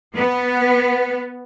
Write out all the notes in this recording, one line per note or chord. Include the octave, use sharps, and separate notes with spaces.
B3